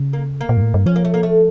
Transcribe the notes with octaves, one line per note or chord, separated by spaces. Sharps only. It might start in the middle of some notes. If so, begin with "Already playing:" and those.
Already playing: C#3
A#3
A#3
A#2
G2
A2
G2
F3 C#4
A#3
A3
A#3
A3